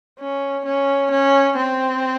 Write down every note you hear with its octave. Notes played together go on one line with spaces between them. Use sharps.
C#4
C#4
C#4
C4